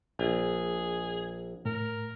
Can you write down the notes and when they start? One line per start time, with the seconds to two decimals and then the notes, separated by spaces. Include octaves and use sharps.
0.19 A#1 G#4
1.65 A2 A#4